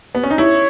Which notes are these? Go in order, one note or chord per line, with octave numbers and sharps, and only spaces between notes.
B3
C#4
D#4
E4 C#5